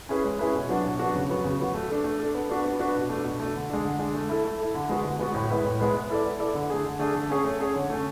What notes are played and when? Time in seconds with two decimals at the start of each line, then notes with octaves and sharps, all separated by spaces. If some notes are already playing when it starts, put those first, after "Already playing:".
0.09 C#4 E4 G#4 B4
0.25 G#3
0.39 C#4 E4 G#4 B4
0.54 B2
0.69 F#3 B3 D4 F#4
0.85 B2
0.99 F#3 B3 D4 F#4
1.14 C#3
1.29 F#3 B3 F#4
1.44 C#3
1.60 F#3 B3 F#4
1.74 A3
1.89 D4 A4
2.04 A3
2.19 D4 A4
2.34 B3
2.50 D4 F#4 B4
2.64 B3
2.79 D4 F#4 B4
2.95 B2
3.10 A3 D4
3.25 B2
3.40 A3 D4
3.55 D3
3.70 G#3 D4
3.84 D3
3.99 G#3 D4
4.15 A3
4.29 E4 A4
4.45 A3
4.60 E4 A4
4.74 D3
4.89 G#3 B3 F#4 B4
5.04 D3
5.19 G#3 B3 F#4 B4
5.34 A2
5.50 G#3 B3 E4 B4
5.64 A2
5.80 G#3 B3 E4 B4
5.94 B3
6.10 E4 A4 D5
6.25 B3
6.39 E4 A4 D5
6.54 D3
6.70 A3 D4 G#4
6.84 D3
6.99 A3 D4 G#4
7.15 A3
7.30 C#4 G#4 C#5
7.45 A3
7.60 C#4 G#4 C#5
7.75 D3
7.90 A3 C#4